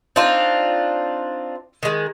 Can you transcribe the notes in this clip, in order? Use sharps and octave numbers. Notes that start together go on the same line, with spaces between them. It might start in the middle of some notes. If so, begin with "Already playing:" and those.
C4 D4 D#4 F4
D#3 G#3